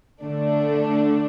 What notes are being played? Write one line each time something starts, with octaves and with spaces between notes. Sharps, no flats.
D3 A3 D4